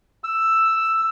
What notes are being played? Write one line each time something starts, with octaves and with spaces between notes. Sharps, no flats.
E6